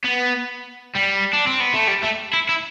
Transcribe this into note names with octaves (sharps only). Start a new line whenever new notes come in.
B3
G3
D4
C4
B3
A3
G3
A3
E4
E4